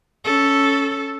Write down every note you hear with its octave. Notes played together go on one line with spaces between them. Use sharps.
C#4 A4